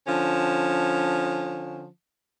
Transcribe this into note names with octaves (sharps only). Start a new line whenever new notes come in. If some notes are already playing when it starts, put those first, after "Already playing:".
D3 F3 C#4